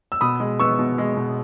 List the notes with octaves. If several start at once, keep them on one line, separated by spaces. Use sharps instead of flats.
E6
B2 B5 D#6
G#3
B3 C#6 E6
B2
G#3
B2